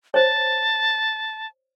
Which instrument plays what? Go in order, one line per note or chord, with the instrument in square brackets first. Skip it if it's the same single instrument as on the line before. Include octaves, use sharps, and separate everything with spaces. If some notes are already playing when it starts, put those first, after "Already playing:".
[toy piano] C5 C#5 [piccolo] A5